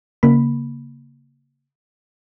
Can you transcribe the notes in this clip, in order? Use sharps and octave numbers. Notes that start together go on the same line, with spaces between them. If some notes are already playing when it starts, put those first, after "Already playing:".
C#3 A#3 B5